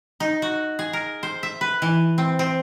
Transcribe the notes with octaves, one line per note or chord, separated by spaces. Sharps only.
D#4
F#4
G#4
A#4
C5
E5
B4
E3
C4
C4